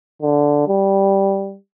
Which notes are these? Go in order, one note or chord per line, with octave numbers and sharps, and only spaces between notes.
D3
G3